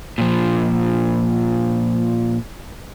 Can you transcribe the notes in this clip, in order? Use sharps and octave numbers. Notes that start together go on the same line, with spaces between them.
A#2 F3